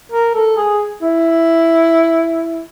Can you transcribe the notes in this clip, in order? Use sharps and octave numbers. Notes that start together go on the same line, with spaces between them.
A#4
A4
G#4
E4